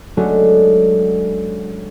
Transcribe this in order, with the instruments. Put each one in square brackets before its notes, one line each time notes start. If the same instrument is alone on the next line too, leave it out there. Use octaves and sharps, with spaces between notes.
[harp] F#3 G#3 A3 C#4 D4 F#4